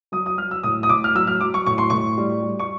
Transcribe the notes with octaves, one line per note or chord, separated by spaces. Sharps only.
F#3 D#6
D#6
F#3 F6
E6
A2 D#6
D#6
A2 D6
F6
F#3 E6
F6
F#3 D6
C#6
A2 C#6
C6
A2 C#6
G3
G3
C#6